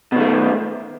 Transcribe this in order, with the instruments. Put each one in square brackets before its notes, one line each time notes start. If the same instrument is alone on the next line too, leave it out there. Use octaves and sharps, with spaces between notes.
[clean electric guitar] B2
D#3
A3